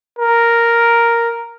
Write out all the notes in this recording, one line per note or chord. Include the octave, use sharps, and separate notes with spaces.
A#4